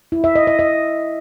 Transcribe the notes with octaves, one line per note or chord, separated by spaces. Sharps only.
E4
E5
D#5
D#5
D#5